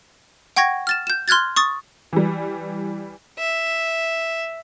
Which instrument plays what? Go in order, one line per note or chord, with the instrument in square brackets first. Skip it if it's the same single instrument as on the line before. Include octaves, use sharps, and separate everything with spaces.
[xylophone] F#5 G5 C#6 G#6 A#6
F6 A6 E7
G6 E7
C6 F6 F#6 G#6 A6
C#6 D#6 A6
[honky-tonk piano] E3 G3
[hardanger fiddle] E5